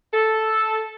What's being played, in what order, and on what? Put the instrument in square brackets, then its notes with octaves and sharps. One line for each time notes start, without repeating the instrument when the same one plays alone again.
[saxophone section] A4